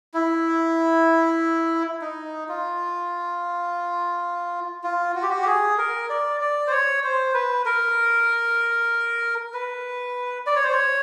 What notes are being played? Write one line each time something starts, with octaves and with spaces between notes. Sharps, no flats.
E4
D#4
F4
F4
F#4
G4
F#4
G4
G#4
A#4
D5
D5
C5
C#5
C5
B4
A#4
B4
D5
C#5
C5
C#5